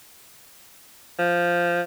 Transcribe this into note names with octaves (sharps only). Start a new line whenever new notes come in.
F3